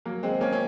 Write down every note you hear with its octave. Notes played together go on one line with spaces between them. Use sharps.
F#3 A#3
G#3 C4
A#3 C#4
C#4